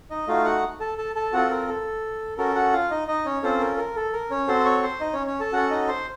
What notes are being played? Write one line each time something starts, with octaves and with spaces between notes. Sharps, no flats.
D#4 D#5
A3 D#4 F4 F#4 F5
F#4 F#5
A4 A5
A4 A5
A4 A5
C4 F4 F#4 A4 F#5
A#4
A4
C#4 F#4 A4 A#4
F#4 F#5
F4 F5
D#4 D#5
D#4 D#5
C#4 C#5
C4 C#4 F4 A4 C5
A#4
A#4
A4
A#4
C#4 C#5
C4 F#4 A4 C5 C6
C#5 C#6
C5 C6
D#4 D#5
C#4 C#5
C#4 C#5
A4 A5
C#4 F#4 A4 F#5
D#4 D#5
C5 C6